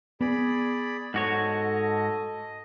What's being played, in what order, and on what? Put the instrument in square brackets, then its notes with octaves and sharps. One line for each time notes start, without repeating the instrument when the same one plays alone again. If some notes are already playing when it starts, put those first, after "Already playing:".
[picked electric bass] B3 [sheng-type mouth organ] G#4 D5 B5
[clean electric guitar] G#2 F#4 C#5 [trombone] A4 [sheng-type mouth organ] D#5